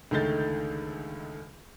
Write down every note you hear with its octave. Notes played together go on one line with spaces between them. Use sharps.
C#2 D3 D#3 A3 G6 A6